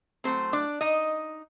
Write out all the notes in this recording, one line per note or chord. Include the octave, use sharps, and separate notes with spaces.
A2 F#3 A3 C4 C5
D4 D5
D#4 D#5